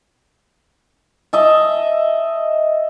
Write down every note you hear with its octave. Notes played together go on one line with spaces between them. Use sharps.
D#5 E5 A5